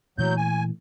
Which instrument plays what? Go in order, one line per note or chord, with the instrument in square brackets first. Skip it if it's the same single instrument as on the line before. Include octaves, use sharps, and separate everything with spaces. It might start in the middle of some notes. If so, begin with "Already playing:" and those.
[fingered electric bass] A#2 E3 A3 [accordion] F#3 G6
[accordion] G#5